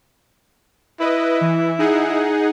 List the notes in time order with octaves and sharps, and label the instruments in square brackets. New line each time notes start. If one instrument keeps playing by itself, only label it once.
[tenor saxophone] E4 [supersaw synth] B4 D#5
[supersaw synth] E3
D#4 G#4 F#5